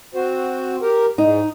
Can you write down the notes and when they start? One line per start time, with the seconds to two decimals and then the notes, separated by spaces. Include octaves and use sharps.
0.14 C4 F#4 C5
0.82 G4 A#4
1.18 G#2 D#4